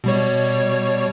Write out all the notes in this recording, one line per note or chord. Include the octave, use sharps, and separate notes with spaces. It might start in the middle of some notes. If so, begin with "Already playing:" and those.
B2 G3 C#5